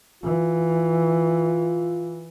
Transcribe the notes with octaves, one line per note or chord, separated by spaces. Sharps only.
E3 F4